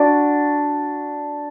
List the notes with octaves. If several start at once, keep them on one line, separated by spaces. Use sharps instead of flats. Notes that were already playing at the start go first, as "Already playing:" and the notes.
Already playing: D4 F#4